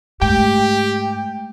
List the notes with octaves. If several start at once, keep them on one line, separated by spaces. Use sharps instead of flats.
G#2 G#3 A3 G4 G5